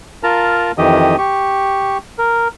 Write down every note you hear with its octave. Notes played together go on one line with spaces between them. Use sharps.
F4 A#4 A5 A#5
F2 D#3 E3 G4 D#5 D#6
G4 C#6
A#4